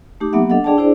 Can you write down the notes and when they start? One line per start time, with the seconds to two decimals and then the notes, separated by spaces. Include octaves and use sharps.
0.20 A3 D#4 G4 D6
0.33 F#3 A#3 B3 G4 E5 F#5
0.50 D4 A4 D#5 F#5
0.64 D4 G#4 D5 G5 A5
0.77 D4 E4 G#4 C5 D5